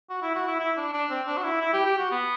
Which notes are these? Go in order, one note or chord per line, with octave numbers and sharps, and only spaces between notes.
F#4
E4
F#4
E4
E4
D4
D4
C4
D4
F#4
E4
E4
G4
G4
F#4
B3